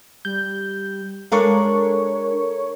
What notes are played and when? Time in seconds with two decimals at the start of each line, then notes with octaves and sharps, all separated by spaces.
0.25 G3 G6
1.32 G#3 D4 A4 A#4 C#5 F5 C#6